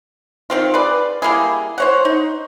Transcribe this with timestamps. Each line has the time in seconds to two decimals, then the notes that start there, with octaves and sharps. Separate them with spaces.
0.50 D#3 C4 F4
0.74 G#4 B4 D5
1.22 G3 A#3 E4 G#4
1.78 C5 C#5 F#5
2.05 D#4